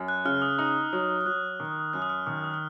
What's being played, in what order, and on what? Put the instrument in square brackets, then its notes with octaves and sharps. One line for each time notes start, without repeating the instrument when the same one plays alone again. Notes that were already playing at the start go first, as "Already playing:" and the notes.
Already playing: [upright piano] F#2
[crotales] F#6
[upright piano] C#3 [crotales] F6
[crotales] D#6
[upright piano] D#4 [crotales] D#6
[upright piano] F#3
[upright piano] F#3 [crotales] F#6
[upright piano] D#3
[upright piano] F#2 [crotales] F#6
[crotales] D#6
F6
[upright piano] D#3 [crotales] F6
[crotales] D#6
F6